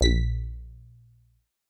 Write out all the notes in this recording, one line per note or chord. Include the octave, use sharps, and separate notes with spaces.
A#1 B6